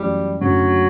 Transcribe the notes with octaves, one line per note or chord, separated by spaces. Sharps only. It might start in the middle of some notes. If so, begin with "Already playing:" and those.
Already playing: F#2 E3 G3 A3
F#1 F#2 D3 F#3 A3